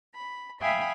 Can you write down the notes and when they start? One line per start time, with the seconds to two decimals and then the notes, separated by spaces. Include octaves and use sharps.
0.15 B5
0.61 E5 F5 G5 G#5 B5 D#6